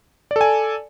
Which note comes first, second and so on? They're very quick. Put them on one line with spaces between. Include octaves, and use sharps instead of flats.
D5 A4 G#5